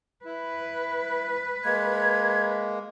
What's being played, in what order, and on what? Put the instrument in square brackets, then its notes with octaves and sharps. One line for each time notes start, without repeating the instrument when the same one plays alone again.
[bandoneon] E4 [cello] B4
[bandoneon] G#3 A#3 [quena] G#6